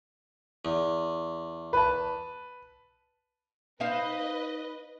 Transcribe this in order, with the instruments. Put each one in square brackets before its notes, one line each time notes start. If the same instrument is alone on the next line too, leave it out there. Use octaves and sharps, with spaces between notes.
[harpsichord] E2
[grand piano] B4 A5
[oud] D#4 C5 F5 [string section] B4 D#5